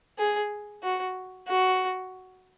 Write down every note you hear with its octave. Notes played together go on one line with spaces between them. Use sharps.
G#4
F#4
F#4